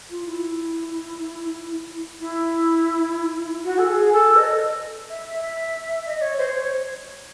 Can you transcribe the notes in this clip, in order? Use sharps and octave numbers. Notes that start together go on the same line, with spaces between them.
F4
E4
E4
F#4
A4
G#4
A4
D#5
E5
E5
D#5
C#5
C5
C#5